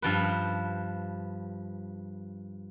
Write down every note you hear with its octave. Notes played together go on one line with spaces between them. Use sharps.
G2 F3 B4